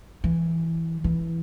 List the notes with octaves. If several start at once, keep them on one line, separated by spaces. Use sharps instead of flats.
E3
E3